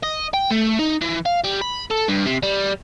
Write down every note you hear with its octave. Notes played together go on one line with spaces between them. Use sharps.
D#5
G5
A3
D#4
E3
F5
G3
B5
A4
G2
C3
G3